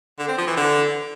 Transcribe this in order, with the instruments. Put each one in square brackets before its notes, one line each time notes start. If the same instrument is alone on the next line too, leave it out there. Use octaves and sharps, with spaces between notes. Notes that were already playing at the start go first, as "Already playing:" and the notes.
[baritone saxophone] D3
C4
F3
E3
D3